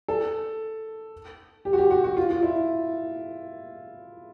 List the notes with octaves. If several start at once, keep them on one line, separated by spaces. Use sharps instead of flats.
A4
G4
F#4
G4
F#4
F#4
F4
F4
E4